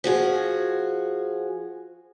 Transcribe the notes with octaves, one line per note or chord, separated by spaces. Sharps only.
F3 F#4 G#4